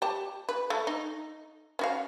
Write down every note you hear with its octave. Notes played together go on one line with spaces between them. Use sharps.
G4 A5
B4
A3
D#4
C#4 F#4 F5